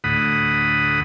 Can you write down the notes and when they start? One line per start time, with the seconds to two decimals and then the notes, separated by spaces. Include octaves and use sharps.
0.04 D2 A2 F#5 B5 D#6